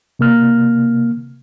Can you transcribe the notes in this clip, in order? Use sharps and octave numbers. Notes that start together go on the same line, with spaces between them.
C3 A#3 F6